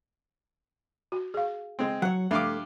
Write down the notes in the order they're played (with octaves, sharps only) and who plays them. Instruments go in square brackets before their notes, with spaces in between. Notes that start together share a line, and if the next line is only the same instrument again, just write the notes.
[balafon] F#4
G#4 F5
[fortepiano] G#3 C4
[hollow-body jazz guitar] F#3 C#5 [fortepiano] F#5
[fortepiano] G2 F5 D6 [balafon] F3 E5 [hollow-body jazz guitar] A3